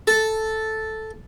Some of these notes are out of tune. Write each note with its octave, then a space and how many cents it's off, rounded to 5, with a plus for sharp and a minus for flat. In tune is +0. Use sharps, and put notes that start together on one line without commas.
A4 -5